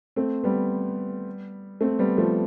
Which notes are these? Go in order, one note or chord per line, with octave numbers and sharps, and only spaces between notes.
A3 C4
G3 B3
A3 C4
G3 B3
F3 A3